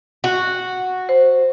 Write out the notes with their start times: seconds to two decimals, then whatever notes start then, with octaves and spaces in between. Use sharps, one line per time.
0.24 F#4
1.09 C5